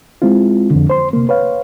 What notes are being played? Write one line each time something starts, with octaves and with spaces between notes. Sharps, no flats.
G#3 C4 E4 F4
F2 D3
C5 C6
C3 A#3
B4 C#5 F5